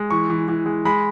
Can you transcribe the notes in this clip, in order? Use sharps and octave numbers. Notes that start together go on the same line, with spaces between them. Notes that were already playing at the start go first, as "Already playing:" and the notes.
Already playing: G#3
E3 C#6
E3
E3
G#3
G#3 B5